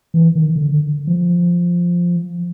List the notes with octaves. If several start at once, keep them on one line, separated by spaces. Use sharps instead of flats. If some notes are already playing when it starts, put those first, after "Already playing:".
E3
D#3
D3
F3